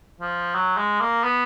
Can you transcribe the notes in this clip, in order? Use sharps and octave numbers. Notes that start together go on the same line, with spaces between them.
F3
F#3
G#3
A#3
B3